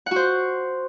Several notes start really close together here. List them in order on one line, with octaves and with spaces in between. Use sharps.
F#5 F#4 C5